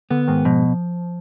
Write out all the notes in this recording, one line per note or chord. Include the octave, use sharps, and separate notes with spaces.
D3 B3
G#2 D#3
B2 F3